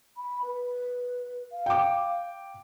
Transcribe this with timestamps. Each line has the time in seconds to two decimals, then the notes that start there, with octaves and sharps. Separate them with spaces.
0.17 B5
0.43 B4
1.52 F5
1.66 G5 D6